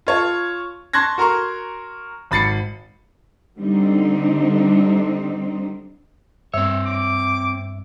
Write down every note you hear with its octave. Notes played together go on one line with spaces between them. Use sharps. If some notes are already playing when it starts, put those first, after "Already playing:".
F4 C#5 A5
A5 C6 C#6 F#6 G#6 A#6
F#4 A#4 A#5 C6 C#6
G#1 B5 A6 C7 C#7
D3 G3 C4 D#4
G2 C4 C#5 E5 E6
D6